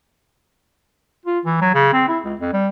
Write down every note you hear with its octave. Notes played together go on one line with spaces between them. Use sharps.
F4
E3
F#3
C#3
C4
E4
C#2
F2
G3